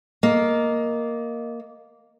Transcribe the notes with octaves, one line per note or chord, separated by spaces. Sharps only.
A#3 D#5